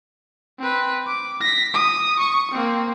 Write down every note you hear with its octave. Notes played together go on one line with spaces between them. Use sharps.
C4 B4
D6
A#6 B6
D#6
C#6
A#3 C4